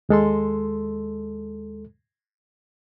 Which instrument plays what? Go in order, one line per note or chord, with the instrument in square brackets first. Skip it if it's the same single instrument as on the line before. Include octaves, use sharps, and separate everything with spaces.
[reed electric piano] D#2 G#3 A4 C6